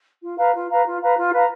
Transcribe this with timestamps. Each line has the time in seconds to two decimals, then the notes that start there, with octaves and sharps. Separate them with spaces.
0.22 F4
0.37 B4 F5 A#5
0.53 F4
0.69 B4 F5 A#5
0.85 F4
1.00 B4 F5 A#5
1.16 F4
1.32 B4 F5 A#5